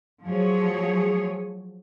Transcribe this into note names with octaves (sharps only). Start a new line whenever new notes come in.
F3 F#3 A3 G#4 C#5